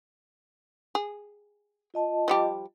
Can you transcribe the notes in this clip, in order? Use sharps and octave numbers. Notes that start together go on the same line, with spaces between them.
G#4
F4 D#5 A5
F3 G3 G4